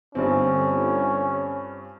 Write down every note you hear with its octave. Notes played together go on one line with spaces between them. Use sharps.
G1 G2 C4 C#4